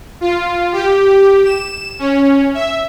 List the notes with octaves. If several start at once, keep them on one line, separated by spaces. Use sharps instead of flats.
F4
G4
E7
C#4
E5